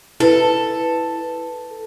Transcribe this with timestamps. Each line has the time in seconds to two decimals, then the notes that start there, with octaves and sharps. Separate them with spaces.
0.20 E4 A4 B4